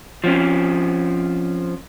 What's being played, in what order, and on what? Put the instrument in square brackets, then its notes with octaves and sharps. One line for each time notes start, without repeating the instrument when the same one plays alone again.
[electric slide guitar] F3 C4 C#4